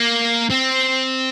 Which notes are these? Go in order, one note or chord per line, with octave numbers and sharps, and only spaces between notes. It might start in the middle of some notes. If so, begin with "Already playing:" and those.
Already playing: A#3
C4